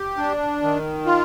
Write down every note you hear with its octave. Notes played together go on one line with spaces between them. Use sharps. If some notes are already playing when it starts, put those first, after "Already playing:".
Already playing: G4
D4
D#3
F4